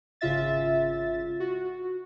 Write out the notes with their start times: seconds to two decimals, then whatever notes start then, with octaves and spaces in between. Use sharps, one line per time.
0.21 G#1 C#3 F4 E5 A6
1.40 F#4